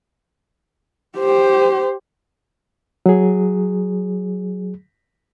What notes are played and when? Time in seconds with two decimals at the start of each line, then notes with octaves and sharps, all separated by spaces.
1.18 G4 C5
3.06 F#3 G#4